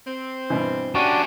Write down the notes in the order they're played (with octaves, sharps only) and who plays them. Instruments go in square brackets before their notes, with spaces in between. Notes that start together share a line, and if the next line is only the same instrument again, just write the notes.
[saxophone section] C4
[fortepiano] G2 B2 E3
[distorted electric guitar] C#4 G4 [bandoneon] D4 F#4 A5 [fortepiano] C#6